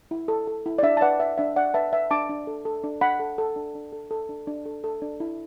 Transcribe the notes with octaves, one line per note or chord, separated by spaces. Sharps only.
E4
A4
A4
E4
D5
D4 E5
A5
B4 D5 F#5
B4 E5
D4 E5
D4 D5 F#5
B4 E5 A5
B4 E5
D4 A5 D6
D4
A4
A4
D4
D4 F#5 B5
A4
A4
D4
D4
A4
A4
D4
D4
A4
A4
D4
E4